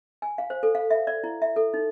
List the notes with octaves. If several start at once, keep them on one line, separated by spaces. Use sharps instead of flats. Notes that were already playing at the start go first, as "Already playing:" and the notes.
G#5
F5
C5
A4
F5
E5
D5
E4
E5
A4
D#4